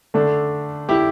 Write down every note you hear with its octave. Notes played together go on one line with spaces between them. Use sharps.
D3 A3 D4
E4 G4